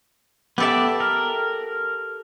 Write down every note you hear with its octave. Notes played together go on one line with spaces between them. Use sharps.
B3 G4 A4 D5 E5
A#4